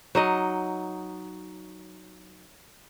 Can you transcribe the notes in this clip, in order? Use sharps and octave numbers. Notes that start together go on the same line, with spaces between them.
F#3 D#4 D#5